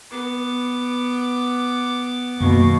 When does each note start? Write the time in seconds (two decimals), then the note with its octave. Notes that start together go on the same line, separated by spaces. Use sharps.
0.11 B3 D6
2.41 F#2 B2 D#3 F#3 A#3 C#6